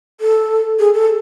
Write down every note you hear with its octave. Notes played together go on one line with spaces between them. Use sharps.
A4
G#4
A4